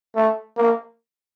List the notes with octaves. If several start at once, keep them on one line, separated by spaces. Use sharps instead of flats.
A3
A#3